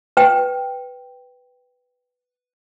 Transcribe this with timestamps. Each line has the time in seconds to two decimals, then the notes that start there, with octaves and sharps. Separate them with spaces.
0.17 B4 G5